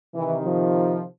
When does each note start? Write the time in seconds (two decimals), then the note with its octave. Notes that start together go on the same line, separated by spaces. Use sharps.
0.14 C3 D#3 E3
0.42 F3